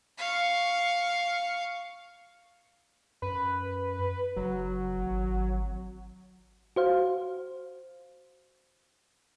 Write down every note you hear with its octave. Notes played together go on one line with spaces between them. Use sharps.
F5 C#6
F#2 B4
F#1 F#3
G#1
F#4 C5 F5